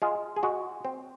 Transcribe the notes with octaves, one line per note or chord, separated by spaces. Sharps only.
G#3 F4
G#4
G#3 F#4
C4